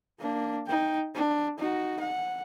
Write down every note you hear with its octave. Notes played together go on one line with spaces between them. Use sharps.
A#3 D4
D#4 G5
D4
D#4 F#4
F#5